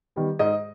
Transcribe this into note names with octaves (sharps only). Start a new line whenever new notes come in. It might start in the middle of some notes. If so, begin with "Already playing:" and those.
D#3 G3 B3
G#2 D#5